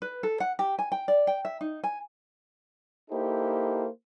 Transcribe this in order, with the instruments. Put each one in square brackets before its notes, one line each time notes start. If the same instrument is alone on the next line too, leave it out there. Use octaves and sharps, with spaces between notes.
[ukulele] B4
A4
F#5
G4
G#5
G5
D5
G5
E5
D#4
G#5
[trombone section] A#3 D#4 E4 G4 A4 C5